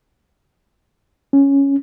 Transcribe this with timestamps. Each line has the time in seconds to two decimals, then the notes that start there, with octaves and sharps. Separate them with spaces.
1.33 C#4